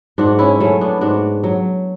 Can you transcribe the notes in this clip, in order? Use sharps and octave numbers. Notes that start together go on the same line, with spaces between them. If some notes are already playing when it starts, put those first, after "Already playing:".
G#2 D4 F#4
C#4 E4
F#3 A3 C#4
B3 D4
G#2 D4 F#4
F#3